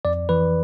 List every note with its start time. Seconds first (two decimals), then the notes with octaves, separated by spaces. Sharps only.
0.05 F2 D5
0.29 E3 B4